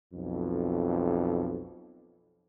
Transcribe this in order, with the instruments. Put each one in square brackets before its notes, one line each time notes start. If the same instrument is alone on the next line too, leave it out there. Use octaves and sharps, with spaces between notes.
[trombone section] B1 F2